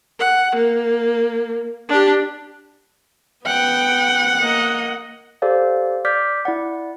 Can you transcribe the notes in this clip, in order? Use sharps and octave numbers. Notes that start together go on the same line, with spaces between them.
F#5
A#3
D4 G4
B3 F#5 G5
A#3 D#5
G4 A4 C5 D5 F5
D5 D6 F6 G6 B6
E4 D5 F#5